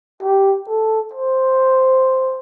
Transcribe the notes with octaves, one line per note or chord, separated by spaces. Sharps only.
G4
A4
C5